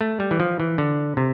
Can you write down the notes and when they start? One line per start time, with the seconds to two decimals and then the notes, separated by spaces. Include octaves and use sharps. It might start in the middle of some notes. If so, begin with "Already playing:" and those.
0.01 A3
0.20 G3
0.31 E3
0.40 F3
0.60 E3
0.78 D3
1.17 C3